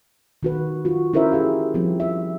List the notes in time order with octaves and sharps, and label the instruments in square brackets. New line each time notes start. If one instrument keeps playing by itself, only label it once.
[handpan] D#3 F#4 B4
F4 F#4
C#4 E4 A#4 C5 E5
G4 G#4 F5
F3 G3 C4
E5